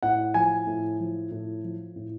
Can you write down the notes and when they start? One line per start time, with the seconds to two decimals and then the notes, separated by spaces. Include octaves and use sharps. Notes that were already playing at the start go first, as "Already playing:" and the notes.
0.03 A2 F#5
0.34 F3 G#5
0.67 A2
1.00 F3
1.31 A2
1.64 F3
1.96 A2